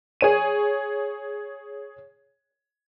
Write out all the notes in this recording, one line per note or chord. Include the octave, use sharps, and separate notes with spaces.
G#4 C#5 D#7